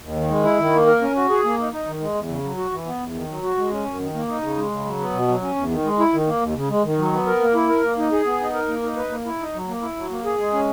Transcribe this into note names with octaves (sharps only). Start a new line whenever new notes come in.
D#2
D#3
G#3
E4
D#3
A#3
A#4
C#4
F#4
G#4
A#3
D#4
D#4
D#3
G#3
E2
C#3
F#3
F#4
E3
B3
E2
D#3
F#3
F#4
G#3
C#4
F#2
D#3
A#3
D#4
C#3
G#3
C#3
F#3
B3
B2
F#3
C#4
E2
D#3
G#3
E4
D#3
A#3
D#2
C#3
G#3
D#3
F#3
B3
A#4
A#3
E4
A#4
A#3
D#4
G#4
B3
D#4
A#4
A#3
D#4
B4
A#3
E4
D#4
F#3
A#3
E4
F#3
A#3
G#4
G#3
C#4